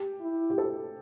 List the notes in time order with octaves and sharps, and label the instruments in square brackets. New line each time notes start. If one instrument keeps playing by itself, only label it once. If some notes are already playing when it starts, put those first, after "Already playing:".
Already playing: [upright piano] G4
[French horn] E4
[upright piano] G4
A4